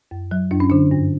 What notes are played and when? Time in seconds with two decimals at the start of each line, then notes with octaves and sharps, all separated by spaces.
0.11 F#2
0.31 F#3
0.51 F#2 D4
0.60 C#4
0.70 D3 D4
0.91 G2